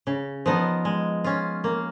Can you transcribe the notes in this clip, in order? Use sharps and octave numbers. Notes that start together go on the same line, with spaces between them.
C#3
F3 B3 D#4
G#3
C#4 F4
A#3